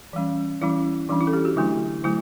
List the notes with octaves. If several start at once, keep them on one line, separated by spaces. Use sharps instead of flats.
E3 G3 C#4
E3 G3 C#4 E4
E3 G3 C#4 D4
E4
A4
G4
F#4
D3 F#3 A3 D4 E4
D3 F#3 A3 E4